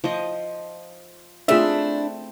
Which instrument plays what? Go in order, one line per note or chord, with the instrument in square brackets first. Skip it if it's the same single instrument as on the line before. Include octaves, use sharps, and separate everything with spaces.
[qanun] F3 D#5
[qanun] A3 C4 [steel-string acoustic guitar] D4 E4 [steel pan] F4 G#4 E5